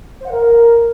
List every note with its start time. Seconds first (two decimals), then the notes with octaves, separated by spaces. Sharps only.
0.21 C5
0.26 F#5
0.31 A#4